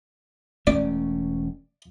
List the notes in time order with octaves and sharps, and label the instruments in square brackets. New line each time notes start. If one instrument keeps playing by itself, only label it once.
[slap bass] E1 A3 C#4 [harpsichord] D5